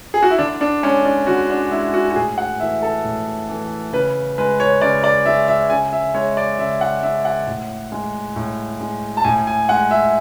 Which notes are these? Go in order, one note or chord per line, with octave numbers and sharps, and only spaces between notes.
G#4
F#4
E4
D3 D4
D4
G#3 C#4
D4
D3 F#4
D4
G#3 E4
F#4
F#4
A2 G#4
F#5
E3 A3 E5
A4
A2
E3 A3
C#3 B4
G#3 B4
C#5
C#3 D5
D5
G#3 E5
E5
C#3 G#5
E5
G#3 C#5
D5
C#3 E5
F#5
G#3 E5
F#5
A2
G#3
A2
G#3
A5
A2 G#5
G#5
G#3 F#5
E5